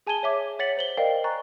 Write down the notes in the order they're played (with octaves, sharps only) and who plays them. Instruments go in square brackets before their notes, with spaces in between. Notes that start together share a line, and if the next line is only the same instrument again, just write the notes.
[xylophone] G#4 G#5 A5 G#6 D#7 G7
C#5 E5 D6 G#6
C#5 F#5 A6 B6 C#7 F#7
C5 F#7 G7
A#4 C5 D5 D#5 F5 G5
G#5 A#5 C#6 F#6 A6